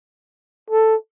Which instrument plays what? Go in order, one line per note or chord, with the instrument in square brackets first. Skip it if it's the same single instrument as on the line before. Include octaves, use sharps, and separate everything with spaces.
[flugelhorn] A4